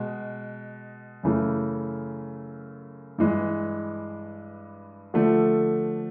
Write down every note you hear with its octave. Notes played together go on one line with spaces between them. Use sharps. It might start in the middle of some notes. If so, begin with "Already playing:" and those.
Already playing: B2 G#3
F#2 C#3 E3 A3
G2 E3 G#3
D3 F3 A3